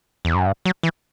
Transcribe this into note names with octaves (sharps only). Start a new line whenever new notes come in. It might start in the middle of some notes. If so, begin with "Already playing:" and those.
E2
F#2
G2
F#3
E3